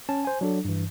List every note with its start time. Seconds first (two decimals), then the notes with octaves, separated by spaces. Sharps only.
0.09 C#4 A5
0.25 C5 G#5
0.41 F#3 D4 A4
0.65 G2 E3